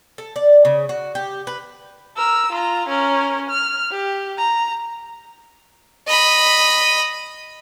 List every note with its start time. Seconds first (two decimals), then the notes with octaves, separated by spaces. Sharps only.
0.18 A4
0.36 D5
0.65 C#3
0.89 F#4
1.15 G4
1.47 B4
2.17 A#4 E6
2.52 F4 A#5
2.89 C#4 A#4
3.50 F6
3.91 G4
4.38 A#5
6.08 D#5 B5